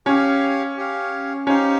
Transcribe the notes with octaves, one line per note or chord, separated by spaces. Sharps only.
C#4 G4 C#5 F5
G4 C#5 F5
C#4 D#4 G4 C5 F5